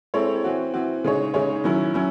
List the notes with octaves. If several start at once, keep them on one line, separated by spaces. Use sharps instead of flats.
G#3 C4 E4 A4 C#5
E3 C4 F#4
E3 C4 F#4
C#3 G#3 D#4 G#4 C#5
C#3 G#3 D#4 G#4 C#5
D#3 F#3 C#4 E4
F#3 C#4 E4